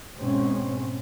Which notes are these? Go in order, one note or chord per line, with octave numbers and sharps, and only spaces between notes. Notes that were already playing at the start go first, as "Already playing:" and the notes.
G#2 B2 C4 C#4